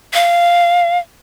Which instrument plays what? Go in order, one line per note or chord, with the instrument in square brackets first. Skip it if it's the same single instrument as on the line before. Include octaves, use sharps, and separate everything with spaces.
[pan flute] F5